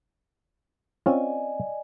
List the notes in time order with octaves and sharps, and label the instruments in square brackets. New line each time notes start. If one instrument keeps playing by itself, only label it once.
[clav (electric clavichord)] C4 C#4 F4 [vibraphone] D5 D#5 G#5